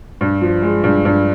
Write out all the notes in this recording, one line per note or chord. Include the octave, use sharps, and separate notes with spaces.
G2
F3
G#3
G2
G2